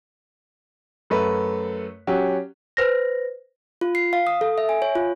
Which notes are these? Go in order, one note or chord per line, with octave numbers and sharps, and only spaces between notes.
F#2 A3 B4
F#3 C#4 G4
B4 C5 A#6
F4
C7
F5
D#6
A4
E5
G#5
C#5
F4